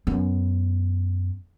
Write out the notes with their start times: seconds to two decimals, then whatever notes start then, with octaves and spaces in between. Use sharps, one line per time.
0.07 F#2 B3